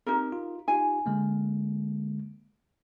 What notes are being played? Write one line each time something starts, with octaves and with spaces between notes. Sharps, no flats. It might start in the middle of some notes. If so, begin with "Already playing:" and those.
C4 D#4 G4 A#4
F4
D#4 F4 G4 G#5
D3 G#3 A#3